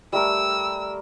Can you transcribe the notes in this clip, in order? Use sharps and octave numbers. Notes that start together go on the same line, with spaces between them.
G3 A3 A#4 E6